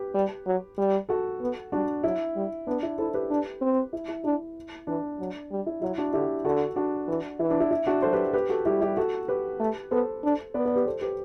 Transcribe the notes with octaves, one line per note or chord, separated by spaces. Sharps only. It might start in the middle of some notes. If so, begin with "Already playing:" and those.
Already playing: G4 B4
G3
F#3
G3
F#4 A4
B3
G3 D4 F#4
F#3 E4
G3
B3 D4
E4
E4 A4 C5
G4 B4
D4
C4
E4
E4
D4 E4
E3 D4
F#3
G3
E4
F#3 E4
D4 F#4
D3 E4 G4
D3 F#4 A4
D4 F#4
E3
E3 E4
D4
E4
E4
D4 F#4
F#3 A4 C5
G4 B4
G4 B4
F#4 A4
G3 E4 G4
E4 G4
F#4 A4
G4 B4
A3
B3 A4 C5
D4
B3 B4 D5
B4 D5
G4 B4
A4 C5
G4 B4